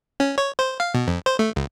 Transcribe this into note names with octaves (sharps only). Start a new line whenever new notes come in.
C#4
C#5
C5
F5
B2
F2
C5
A3
C#2